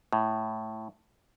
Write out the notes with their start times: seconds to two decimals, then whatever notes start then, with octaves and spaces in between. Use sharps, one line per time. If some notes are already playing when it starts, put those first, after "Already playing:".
0.13 A2